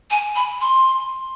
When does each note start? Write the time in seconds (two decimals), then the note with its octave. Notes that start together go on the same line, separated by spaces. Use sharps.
0.11 G#5
0.36 B5
0.61 C6